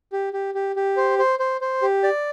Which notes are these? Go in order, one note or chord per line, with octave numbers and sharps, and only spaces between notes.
G4
G4
G4
G4
C5
C5
C5
C5
G4
D5